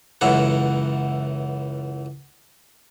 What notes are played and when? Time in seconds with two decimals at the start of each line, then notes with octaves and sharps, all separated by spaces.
0.21 C#2 F#2 E3 A4 F#5